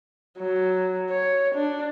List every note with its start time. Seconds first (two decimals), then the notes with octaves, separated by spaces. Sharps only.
0.39 F#3
1.10 C#5
1.55 D4